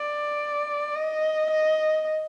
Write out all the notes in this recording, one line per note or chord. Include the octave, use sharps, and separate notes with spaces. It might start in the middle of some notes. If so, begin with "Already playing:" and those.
Already playing: D5
D#5
D#5